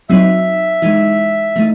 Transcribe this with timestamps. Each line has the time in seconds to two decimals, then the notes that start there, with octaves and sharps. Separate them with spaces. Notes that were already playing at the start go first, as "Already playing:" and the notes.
0.09 F#3 C4 D#4 F#4 E5
0.82 E3 G#3 D#4
1.56 E3 A3 D#4